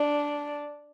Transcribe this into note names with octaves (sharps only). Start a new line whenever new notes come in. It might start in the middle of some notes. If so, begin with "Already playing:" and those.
Already playing: D4